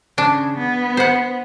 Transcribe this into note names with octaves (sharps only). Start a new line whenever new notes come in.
C#3 D4
B3
C5 F#5